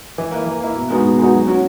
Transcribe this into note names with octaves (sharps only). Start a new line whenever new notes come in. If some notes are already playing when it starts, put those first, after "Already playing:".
E3
A#3 E4
E3
A#3 E4
B2
G#3 B3 D#4 F#4
B2
G#3 B3 D#4 F#4
F#3
C#4 F#4